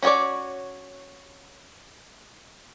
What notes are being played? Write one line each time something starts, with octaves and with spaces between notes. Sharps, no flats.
C#4 F#4 G#4 C#5 D5